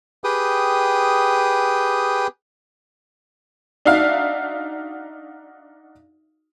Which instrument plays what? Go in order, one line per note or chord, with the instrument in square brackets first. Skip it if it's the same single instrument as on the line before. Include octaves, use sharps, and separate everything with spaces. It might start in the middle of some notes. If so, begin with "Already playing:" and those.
[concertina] G4 G#4 B4 G5 D#6
[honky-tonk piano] D4 D#4 F#4 E5 F5